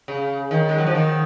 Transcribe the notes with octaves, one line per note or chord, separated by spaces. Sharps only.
C#3
D#3
G#3
F#3
F3
D#3